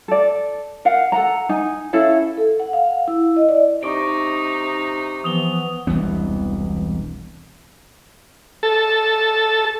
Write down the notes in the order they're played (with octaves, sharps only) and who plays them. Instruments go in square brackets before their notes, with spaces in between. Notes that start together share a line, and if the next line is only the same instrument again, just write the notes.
[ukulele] A4 D5
A#4 F5 F#5
A4 F#5 A#5
D#4 G#5
C#4 E4 A4 F5
[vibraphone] A4
F#5
F5
E4
D#5
D5
[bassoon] C3 [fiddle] D#4 [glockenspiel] C#6 D6 D7
[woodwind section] E3 F3 B3 [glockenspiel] D#6 F7 G7
[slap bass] E1 C2 E3 B3
[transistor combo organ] A4